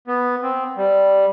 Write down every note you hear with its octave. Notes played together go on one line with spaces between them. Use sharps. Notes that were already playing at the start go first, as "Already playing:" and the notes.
B3
C4
G3